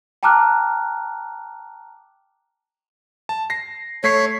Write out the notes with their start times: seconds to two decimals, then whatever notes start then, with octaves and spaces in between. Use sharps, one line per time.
0.23 G5 A5 A#5 D6 F6 F#6
3.29 A5
3.50 A#6 C7
4.04 A3 C#5 B6 C7